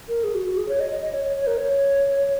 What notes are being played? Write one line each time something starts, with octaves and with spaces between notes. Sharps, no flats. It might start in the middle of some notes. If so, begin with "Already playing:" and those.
A#4
G#4
F#4
F#4
G#4
C#5
D#5
D#5
D#5
C#5
C#5
C#5
A#4
C#5